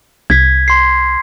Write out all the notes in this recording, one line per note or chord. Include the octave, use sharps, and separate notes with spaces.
C2 G#6 B6
C6 C7